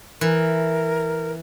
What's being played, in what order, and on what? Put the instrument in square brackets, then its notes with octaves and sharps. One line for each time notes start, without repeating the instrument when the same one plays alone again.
[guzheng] E3 [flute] A#4